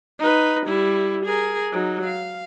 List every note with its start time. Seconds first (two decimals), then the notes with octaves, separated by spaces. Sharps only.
0.20 D#4 B4
0.67 G3 E4
1.25 G#4 A#4
1.72 F#3 D#4
2.06 F5